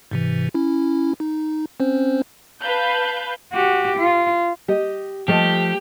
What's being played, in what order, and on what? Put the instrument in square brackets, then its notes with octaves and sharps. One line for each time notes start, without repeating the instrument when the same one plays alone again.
[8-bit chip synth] G#2 C3 E3
C#4 E4
D#4
C4 C#4 C5
[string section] B4 F5 A5 B5 G6
[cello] F#4 G4
F4
[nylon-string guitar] G4 D#5
[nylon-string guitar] F3 A3 D#5 [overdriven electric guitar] G4